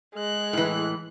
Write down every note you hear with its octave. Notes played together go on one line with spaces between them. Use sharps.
G#3 F#6
A2 E3